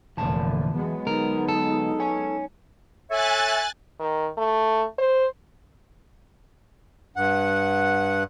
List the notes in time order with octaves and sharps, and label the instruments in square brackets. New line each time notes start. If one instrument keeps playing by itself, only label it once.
[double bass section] F1 A#2 D3 [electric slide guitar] E3 A5
[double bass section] F#3 G#3 B3
[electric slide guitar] D3 [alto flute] D#4 [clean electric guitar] A#4
[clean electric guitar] A4
[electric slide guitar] C#5 G#5
[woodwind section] A4 C#5 E5 [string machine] G#5 F#6 A6
[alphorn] D#3
A3
C5
[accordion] G2 F#5